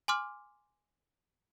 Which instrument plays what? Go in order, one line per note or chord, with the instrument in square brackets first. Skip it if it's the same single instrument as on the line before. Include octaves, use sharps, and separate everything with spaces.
[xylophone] G#5 C6 D6 F6